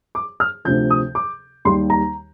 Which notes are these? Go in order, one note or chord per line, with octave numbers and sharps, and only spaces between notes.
D6
F6
D2 C3 F3 G6
D#6
D6
D#2 D#3 G3 A#3 C6
A#5